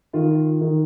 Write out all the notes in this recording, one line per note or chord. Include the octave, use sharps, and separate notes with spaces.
D#3 F4
D#3